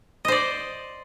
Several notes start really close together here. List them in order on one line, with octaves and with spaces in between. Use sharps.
D#5 C5 D5